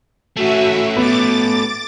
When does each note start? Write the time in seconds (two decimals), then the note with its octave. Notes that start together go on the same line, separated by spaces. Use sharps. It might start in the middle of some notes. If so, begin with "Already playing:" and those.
0.37 A3 C#4 F#4 E5
0.96 B3 D6 A6